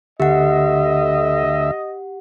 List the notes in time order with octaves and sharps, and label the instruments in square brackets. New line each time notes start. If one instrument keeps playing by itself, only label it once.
[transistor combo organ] D2 E5 [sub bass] D3 [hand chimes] G4 F#5 [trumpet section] D#5